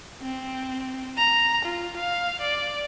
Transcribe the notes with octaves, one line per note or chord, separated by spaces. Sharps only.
C4
A#5
F4
F5
D5